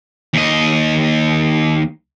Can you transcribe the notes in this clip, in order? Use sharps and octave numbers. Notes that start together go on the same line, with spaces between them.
D#2 D#5